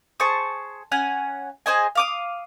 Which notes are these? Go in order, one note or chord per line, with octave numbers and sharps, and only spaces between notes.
G#4 C5 A5 C#6
C#4 F#5 G#5
G#4 C5 D#5 G#5
F5 D6 D#6